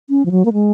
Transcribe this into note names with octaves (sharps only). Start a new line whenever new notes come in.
C#4
F3
F#3
A#3
G#3